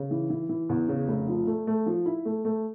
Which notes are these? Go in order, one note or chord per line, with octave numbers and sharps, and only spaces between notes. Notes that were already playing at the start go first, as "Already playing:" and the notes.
Already playing: C#3
E3
E3
E3
E2
C#3
F1
F3
A3
A3
F3
E4
A3
A3